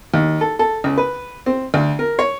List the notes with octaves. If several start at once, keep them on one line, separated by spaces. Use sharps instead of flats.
D#2
A4
A4
C#2
B4
C4
D2
A#4
C#5